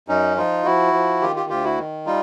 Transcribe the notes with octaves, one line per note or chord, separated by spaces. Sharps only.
F#2 C#4 D#4
F3 D#4 F4
F3 E4 F#4
F3
D#3 F4 G4
F4 G4
D2 F4 G4
E4 F#4
D#3
G3 D#4 F4